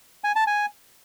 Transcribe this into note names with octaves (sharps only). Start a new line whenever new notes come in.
G#5
A5
G#5